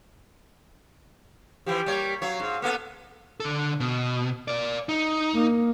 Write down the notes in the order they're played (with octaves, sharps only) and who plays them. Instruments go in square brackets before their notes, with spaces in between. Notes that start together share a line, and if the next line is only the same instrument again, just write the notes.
[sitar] E3 F3 [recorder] G4
[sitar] G3 A#3 C#5
[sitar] F#3 C#5 [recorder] F5
[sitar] G#2
[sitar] A#3 B3 A4 [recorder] F#5
[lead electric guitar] D3 A4
B2
A#4 D5
D#4
[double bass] A#3